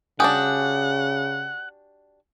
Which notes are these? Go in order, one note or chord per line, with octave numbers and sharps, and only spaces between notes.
C#3 D4 F#4 G4 F#5 G#5 D#6